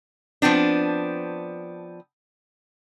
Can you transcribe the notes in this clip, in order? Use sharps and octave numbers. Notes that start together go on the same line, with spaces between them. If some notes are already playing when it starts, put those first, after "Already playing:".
F3 B3 C4 D4